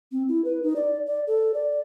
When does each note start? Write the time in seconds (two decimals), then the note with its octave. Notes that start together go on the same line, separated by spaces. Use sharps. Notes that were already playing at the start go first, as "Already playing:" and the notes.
0.12 C4
0.29 E4
0.45 B4
0.63 D#4
0.76 D5
1.07 D5
1.27 A4
1.54 D5